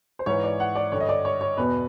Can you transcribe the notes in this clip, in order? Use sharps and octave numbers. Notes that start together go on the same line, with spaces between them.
C5
G#2 E3 C#5
D5
F#5
D5
G2 D3 C#5
D#5
D5
C#5
C#5
E2 B2 B4